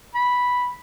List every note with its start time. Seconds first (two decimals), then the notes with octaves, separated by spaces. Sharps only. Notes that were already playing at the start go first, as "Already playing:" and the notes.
0.15 B5